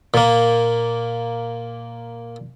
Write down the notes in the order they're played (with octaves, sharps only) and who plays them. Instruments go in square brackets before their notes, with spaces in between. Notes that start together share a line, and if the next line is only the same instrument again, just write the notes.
[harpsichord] A#2 A#3